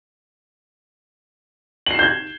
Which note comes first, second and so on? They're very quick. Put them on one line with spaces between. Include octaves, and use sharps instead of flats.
F#7 C7 E7 G6 G#6